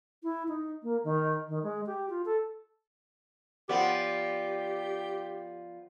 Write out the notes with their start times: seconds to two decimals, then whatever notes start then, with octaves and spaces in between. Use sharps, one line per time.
0.23 E4
0.48 D#4
0.83 A#3
1.04 D#3
1.49 D#3
1.63 G#3
1.86 G4
2.10 F4
2.25 A4
3.69 F3 B3 G4 D5